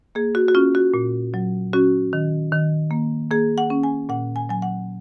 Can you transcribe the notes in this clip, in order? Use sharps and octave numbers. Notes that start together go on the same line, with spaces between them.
A#3 G#4
F#4
F#4
C#4 F4
F#4
A#2
F#3
C#4 F#4
D#3
D#3
A#3
A#3 G#4
F#5
C#4
G#5
A#2 F#5
G#5
F#3 G#5
F#5